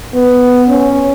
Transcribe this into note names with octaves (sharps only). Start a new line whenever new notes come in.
B3
C#4